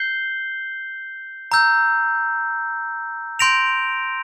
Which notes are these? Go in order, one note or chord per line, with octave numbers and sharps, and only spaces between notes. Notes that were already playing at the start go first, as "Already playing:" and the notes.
Already playing: G6 C7 G7
A#5 E6 G6
C6 G6 A#6 D7 F7